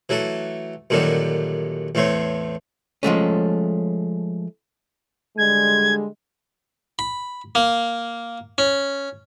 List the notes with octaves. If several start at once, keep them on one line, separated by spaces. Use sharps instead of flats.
E3 F#3 A3 A4
F#2 A#2 D3 D#3 F#3 G3
E2 A2 A3 C4 C#5
F3 G#3 A3 C#4
D3 G3 G#3 G#6
B5
A#3
C#4